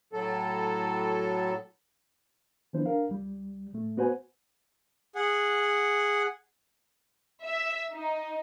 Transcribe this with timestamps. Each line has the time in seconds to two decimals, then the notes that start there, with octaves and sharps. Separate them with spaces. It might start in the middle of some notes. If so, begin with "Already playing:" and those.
0.13 A2 F#3 A4
2.73 D#3 F3 B3 D4 E4 C5
2.86 D4 A#4 F5
3.09 C#2 G3
3.73 A2 A3
3.97 B3 F#4 B4 C5 F#5 G#5
5.15 G#4 F#5
7.45 E5
7.91 D#4